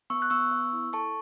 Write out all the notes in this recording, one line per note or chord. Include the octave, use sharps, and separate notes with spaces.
B3 C#6 E6
F#6
B3 C#6 E6
B3
E4
A4 A5 C#6